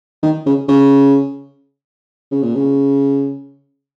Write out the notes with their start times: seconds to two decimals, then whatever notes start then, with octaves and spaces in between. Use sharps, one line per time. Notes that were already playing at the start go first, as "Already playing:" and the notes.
0.23 D#3
0.46 C#3
0.68 C#3
2.32 C#3
2.43 A#2
2.55 C#3